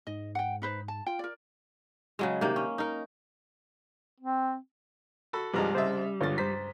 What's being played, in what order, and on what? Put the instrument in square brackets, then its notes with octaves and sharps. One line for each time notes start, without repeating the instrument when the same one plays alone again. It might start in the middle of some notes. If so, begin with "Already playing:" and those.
[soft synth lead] G#2 [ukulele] D#5
[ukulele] F#5 G5
D#4 B4 C5
A5
[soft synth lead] F4 [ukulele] G5
[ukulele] A#4 D5
[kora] C#3 F#3 G#3
C3 D#3 A#3
C#4
D#4 A#4
[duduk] C4
[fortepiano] F#4 A4 B5
[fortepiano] C2 A5 A#5 [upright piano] G2 F3 G#3 [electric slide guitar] G3
[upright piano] C#3 D#5 E5 [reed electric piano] C5 A6
[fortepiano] C#2 [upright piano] G2 A6 [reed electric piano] D3 F4 C#5
[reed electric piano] G2 C5 A#5 [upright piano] B6